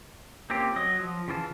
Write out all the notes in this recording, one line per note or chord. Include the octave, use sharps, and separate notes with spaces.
A#3 C4 C#4 F4 G4
F#3 D#5
F3
C#3 E3 F4 A5